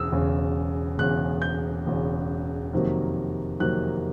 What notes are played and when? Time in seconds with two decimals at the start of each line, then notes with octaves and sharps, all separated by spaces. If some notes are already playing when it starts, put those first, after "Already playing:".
Already playing: E1 E2 C#3 D#6 E6
0.11 E1 E2 C#3
0.98 E1 E2 C#3 F#6
1.42 G6
1.86 E1 E2 C#3
2.73 F2 C3 D#3 F#3 A#3
3.60 F2 C3 D#3 F#3 A#3 F#6